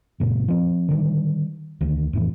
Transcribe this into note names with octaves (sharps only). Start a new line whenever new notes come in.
F#2 A#2 C#3
F3 C4
D3 D#3 G3
D2 D3 D#3
F2 A2 E3